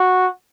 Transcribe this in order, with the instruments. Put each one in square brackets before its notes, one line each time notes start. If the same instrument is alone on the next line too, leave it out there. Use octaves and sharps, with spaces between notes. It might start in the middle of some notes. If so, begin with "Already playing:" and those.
Already playing: [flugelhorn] F#4